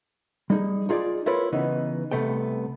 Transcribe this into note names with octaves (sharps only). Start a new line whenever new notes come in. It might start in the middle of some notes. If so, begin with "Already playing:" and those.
G3 D#4 G#4
D#4 F4 G#4 B4 D5
E4 F4 A#4 B4 C#5
C#3 E3 B3 D#4
C2 C3 A3 B3 G5